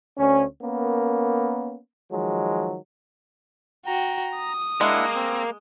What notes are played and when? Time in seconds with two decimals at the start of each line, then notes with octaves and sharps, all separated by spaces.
0.18 D2 C#4
0.62 A#3 B3 C#4 A#4
2.12 D#3 F3 F#3 G#3
3.86 F#4 G5 A#5
4.37 D#6
4.81 G#3 A#3 D4 E4 F#5
5.15 C4